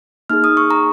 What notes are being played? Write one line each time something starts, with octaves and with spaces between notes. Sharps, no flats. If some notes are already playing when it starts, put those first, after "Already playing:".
A#3 D#4 G#4 F6
D#6
C#6
A#5